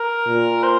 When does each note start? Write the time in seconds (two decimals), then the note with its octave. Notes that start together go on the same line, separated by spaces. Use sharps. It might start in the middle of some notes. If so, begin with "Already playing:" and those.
Already playing: A#4
0.27 A#2
0.63 C5